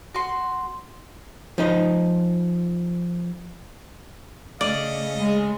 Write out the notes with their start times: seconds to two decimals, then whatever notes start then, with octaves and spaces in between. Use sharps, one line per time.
0.14 F#4 C6
1.58 F3 D#4 D#5
4.61 C#3 A3 D5 D#5 F5
5.17 G#3